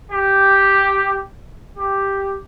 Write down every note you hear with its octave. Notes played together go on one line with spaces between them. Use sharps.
G4
G4